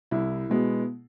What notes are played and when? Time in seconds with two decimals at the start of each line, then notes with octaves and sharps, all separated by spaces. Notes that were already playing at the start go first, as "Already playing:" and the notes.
0.11 C2 E4
0.49 B2 G#3 B3